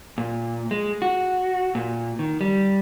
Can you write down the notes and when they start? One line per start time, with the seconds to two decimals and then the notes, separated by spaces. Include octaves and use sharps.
0.18 A#2
0.71 G#3
1.02 F#4
1.75 A#2
2.19 D#3
2.41 G3